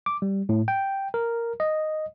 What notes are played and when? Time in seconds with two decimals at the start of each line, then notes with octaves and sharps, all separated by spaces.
0.06 D6
0.22 G3
0.49 A2
0.68 G5
1.14 A#4
1.60 D#5